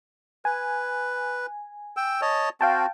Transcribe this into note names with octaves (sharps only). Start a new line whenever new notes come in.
B4 G#5
G5 E6
C#5 D#5 A5
C4 F#4 F5 G5 A5